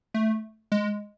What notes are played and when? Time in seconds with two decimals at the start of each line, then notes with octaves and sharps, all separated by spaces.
0.14 A3
0.72 G#3